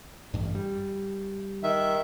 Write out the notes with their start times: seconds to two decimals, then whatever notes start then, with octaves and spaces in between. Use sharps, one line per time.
0.34 A1 G2
0.55 G3
1.63 D#3 E5